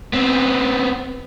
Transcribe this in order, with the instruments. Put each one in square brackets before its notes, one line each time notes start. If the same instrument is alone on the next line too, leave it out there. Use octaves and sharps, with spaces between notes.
[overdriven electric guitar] B3 C4